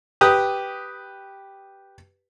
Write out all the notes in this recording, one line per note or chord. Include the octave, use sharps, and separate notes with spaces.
G4 B4 D#6